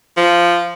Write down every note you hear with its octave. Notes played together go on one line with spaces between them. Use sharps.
F3